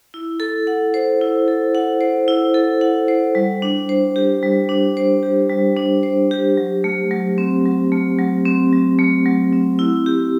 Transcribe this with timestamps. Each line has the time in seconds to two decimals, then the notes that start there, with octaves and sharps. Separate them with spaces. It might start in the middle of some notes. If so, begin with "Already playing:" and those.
0.14 E4
0.40 A4
0.67 F#5
0.94 C5
1.21 E4
1.48 A4
1.75 F#5
2.01 C5
2.28 E4
2.54 A4
2.81 F#5
3.08 C5
3.35 G3
3.62 D4
3.89 C5
4.16 G4
4.43 G3
4.69 D4
4.97 C5
5.23 G4
5.50 G3
5.77 D4
6.03 C5
6.31 G4
6.57 F#3
6.84 A3
7.11 F#3
7.38 C4
7.65 F#3
7.92 A3
8.19 F#3
8.45 C4
8.73 F#3
8.98 A3
9.26 F#3
9.53 C4
9.79 E4
10.06 G4